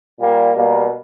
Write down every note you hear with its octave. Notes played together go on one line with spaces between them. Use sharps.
A#2 G3 A#3
B2 G3 A#3